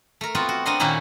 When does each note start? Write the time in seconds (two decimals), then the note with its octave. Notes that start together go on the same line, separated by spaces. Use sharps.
0.21 A3 A#4
0.35 B3 C4 F4 F#4
0.49 F#4
0.65 C4 D4 A#4 D#5 F#5 C6
0.80 A#2 D#3 A#3 C#4 E4 F#4